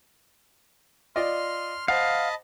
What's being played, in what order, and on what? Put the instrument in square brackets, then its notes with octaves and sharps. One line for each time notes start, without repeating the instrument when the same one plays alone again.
[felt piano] F4 D5 D#5 [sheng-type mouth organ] C6 F6
[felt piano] C5 F#5 [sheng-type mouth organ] D#5 A5 B5 [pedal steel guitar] F5